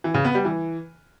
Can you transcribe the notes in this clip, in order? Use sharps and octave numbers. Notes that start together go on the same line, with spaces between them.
E3
C#3
B3
G3
E3